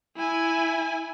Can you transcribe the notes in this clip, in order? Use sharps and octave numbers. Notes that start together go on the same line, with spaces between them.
E4 G#5